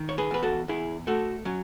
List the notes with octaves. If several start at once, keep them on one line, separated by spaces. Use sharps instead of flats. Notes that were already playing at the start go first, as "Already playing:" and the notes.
Already playing: D#3
C#5
G#4 B4
E2 B4
F#4 A4
E2 E4 G#4
A3 F#4 A4
F#3 C#4